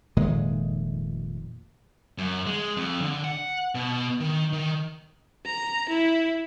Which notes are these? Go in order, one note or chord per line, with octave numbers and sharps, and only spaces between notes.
F1 A#2 D#3 G#3
F#2
G#3
F2
D3
F#5
B2
D#3
D#3
A#5
E4